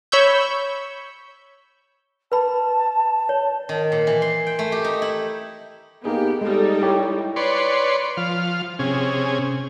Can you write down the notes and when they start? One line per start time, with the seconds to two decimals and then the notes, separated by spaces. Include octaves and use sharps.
0.12 C#5 B5 C#6 E6 G6
2.32 B4 A5 B5
3.29 C#5
3.69 D#3
3.92 A#2
4.07 E3
4.22 C6
4.47 G5
4.59 A3
4.72 G4
4.84 D#4
5.02 E4
6.05 A#3 B3 D#4 G4 G#4
6.41 G3 G#3 D#4 A4
6.82 E4 G4 C#5
7.36 B4 C#5 D5 C6
8.17 F3 F5
8.79 C3 C#4 G#4